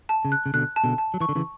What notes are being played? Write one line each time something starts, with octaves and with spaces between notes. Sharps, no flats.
A5
C#3
F#6
C#3
B2 D3 F#6
A5
B2 D3
A5
F#3
E3 C#6
D3
C#3 E3